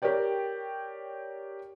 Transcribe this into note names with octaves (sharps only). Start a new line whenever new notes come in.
G4 A#4 C#5 D5 G5